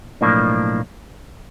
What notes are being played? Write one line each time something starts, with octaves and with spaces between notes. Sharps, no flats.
B1 A2 F3 A#3 D4